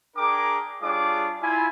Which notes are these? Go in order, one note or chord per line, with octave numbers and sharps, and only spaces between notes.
D4 G#4 A#4 G5 A#5 D6
G3 D4 F4 G#4 C#5 D6
E4 F4 G#5